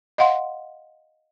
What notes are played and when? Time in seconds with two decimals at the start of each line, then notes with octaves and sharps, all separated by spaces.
0.18 D#5 F5 F#5 C6